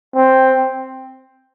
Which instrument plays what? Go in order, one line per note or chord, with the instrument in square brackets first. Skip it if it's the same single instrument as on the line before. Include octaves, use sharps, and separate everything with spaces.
[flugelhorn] C4